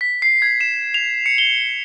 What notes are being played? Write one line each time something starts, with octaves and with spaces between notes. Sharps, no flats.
B6
C7
G#6
E7
F7
C#7
G7